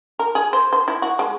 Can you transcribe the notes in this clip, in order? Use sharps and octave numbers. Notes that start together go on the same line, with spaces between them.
A#4
G#4
C5
C5
E4
F#4
G#3